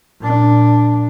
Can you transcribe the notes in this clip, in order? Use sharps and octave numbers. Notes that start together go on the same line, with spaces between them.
A#2 D4